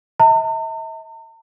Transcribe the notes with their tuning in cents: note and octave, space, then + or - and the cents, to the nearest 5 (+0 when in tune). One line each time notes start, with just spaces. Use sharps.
E5 -45 A#5 -45